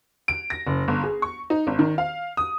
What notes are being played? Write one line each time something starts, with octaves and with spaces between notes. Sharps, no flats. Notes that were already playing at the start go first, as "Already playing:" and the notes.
D7
A#6
F#1
G1
G#4
C#6
D#4
G#1
D#3
F5
D#6